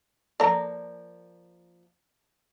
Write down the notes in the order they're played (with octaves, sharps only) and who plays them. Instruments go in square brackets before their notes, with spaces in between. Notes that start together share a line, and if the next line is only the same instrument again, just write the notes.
[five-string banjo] F3 A#3 D5 [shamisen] A4 A#5